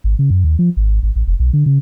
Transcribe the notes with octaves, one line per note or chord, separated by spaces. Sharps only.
G#1
C#3
F#2
D#2
F3
G#1
G#1
A1
F1
B1
D3
C#3